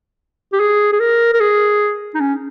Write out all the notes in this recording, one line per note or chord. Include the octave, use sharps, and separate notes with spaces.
G4
G#4
G#4
A#4
A#4
G#4
D#4
C#4